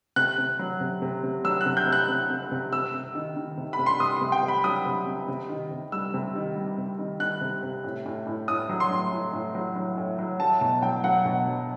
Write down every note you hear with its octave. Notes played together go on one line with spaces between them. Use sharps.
C3 F#6
C3
F#3
C3
C3
C3
F#3 E6
F#6
C3
G6
C3
F#6
C3
C3
C3
C3 E6
C3
D#3
D#3
C3
B5
C3
C6
C3 D#6
C6
C3
G5
C3
B5
F#3 D#6
C3
C3
C3
D#3
C3
G3 E6
C3
D#3
G3
C3
D#3
D#3 F#6
C3
C3
A2
A2
A2
A2 D#6
F#3
C6
A2
A2
A2
F#3
F#3
A2
F#3
F#3 A5
B2 A5
F#3 G5
F#3 F#5
B2
F#3